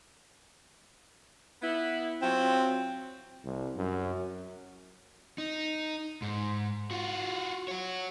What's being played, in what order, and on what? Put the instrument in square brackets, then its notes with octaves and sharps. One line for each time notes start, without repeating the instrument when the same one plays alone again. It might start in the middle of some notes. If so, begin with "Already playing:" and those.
[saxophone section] B3 E4
[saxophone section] F#3 F4 [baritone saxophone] C4
[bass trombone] C2
F#2
[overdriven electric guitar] D#4
G#2
F4 F#4
F#4 C#5